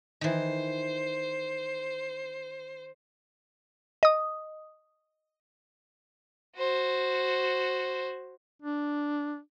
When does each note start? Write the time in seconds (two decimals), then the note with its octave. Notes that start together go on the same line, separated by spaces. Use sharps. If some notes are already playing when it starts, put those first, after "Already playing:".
0.21 D#3 E3 C5
4.03 D#5 D#6
6.57 F#4 C5
8.62 D4